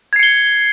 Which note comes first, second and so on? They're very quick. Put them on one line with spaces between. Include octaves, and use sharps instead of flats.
G#6 C7 C#7 G7